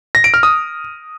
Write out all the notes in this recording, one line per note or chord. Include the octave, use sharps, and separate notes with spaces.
A#6
D7
F6
D#6